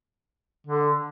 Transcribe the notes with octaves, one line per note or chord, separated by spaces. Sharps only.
D3